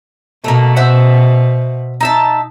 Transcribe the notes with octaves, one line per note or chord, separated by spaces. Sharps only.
B2 A3 A#3
C5 E5 F#5
D#4 E5 A5